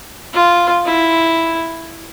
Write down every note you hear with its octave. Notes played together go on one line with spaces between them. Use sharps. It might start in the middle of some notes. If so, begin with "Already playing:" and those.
F4
E4